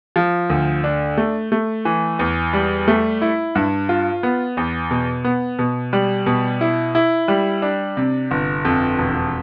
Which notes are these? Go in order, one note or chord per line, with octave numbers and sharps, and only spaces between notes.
F3
D2
D4
A3
A3
E3
E2
G3
A3
E4
G2
F4
B3
E2
B2
B3
B2
G3
B2
E4
E4
G3
D4
C3
G1
F2
E1